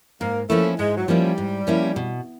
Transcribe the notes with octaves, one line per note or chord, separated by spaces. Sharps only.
G#2 A#3
F3 A3 A#3 C#4 E4
G#2 G#3
F#3
F3 G3 A#3 C#4 E4
G#2
F3 A#3 C#4 E4
B2